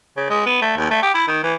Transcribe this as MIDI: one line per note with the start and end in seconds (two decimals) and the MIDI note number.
0.17 0.27 49
0.30 0.43 56
0.46 0.59 59
0.62 0.74 57
0.77 0.88 39
0.90 0.99 57
1.02 1.11 67
1.14 1.25 64
1.28 1.42 51
1.43 1.55 52